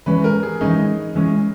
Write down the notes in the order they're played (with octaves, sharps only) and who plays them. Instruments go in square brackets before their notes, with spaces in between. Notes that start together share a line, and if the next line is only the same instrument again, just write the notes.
[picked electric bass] E3 G#3 C#4 [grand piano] B4
[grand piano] A#4
G#4
[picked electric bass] E3 G#3 C#4 [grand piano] D#4
[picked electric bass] E3 G#3 C#4